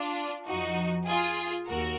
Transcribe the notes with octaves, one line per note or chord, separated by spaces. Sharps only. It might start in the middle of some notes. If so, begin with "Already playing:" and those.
Already playing: D4 F4
F2 F3 D#4 F#4
F4 G#4
D#2 F#4 A#4